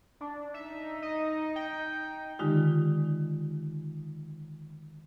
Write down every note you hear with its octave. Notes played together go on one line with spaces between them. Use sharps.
D4
D#4 E5
D#5
G5
D3 D#3 G#3 D#4 F4 G4